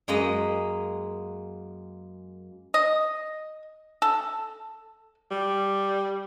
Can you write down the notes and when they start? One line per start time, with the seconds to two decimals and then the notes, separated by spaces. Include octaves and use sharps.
0.08 F#2 G#3 A#3 B4 D#5
2.74 D#5
4.02 A4
5.31 G3